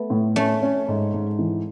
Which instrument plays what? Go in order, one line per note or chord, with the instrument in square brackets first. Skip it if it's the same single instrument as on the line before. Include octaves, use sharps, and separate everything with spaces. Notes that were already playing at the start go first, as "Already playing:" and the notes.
Already playing: [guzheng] A3 B3
[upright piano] A2
[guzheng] A3 [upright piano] C#4
[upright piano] C#4
G#2
G#2
E3